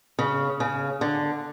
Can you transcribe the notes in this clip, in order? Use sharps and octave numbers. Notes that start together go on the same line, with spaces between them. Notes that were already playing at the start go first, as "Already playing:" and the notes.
C#3
C#3
D3